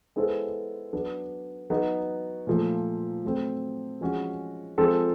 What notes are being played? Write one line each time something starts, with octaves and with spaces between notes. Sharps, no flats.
G#3 B3 E4 A4 C5
F#3 B3 D4
F#3 B3 D#4 F#4
A#2 F3 A3
F#3 A3 C4
F3 G#3 C#4 F#4
F3 G#3 C4 F4 A4